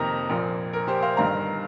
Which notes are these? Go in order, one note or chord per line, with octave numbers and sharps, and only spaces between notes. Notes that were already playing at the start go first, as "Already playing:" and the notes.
Already playing: F2 C3 D#3 A#3 A#5 D#6 F6
A#1 A#2 A#3
A#4
G4 C5
C5 F5
G1 G2 D#3 F5 A#5